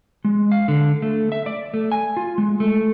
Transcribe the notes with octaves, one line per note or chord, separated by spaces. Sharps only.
G#3
F5
D3
A3
E5
D5
A3
G#5
F4
G#3
A3